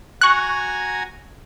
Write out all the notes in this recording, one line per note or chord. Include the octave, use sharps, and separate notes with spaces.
F#4 G#5 A#5 C#6 F#6